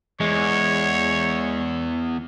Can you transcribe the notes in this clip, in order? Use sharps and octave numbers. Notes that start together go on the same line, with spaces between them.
E2 G#3 C#5